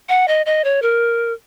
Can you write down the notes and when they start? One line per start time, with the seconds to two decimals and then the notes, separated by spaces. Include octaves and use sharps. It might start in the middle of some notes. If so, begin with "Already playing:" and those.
0.09 F#5
0.28 D#5
0.46 D#5
0.64 C#5
0.82 A#4